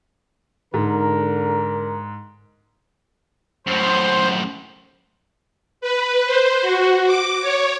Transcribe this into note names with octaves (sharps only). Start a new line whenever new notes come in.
G#2 D3 A#4
F#2 A2 C5
B4
C5
F#4
D6
C#5